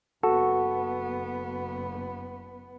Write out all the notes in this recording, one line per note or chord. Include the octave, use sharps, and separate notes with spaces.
F#1 B3 F#4 A4